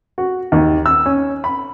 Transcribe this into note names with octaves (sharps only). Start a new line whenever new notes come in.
F#4
D#2
E6
C#4
B5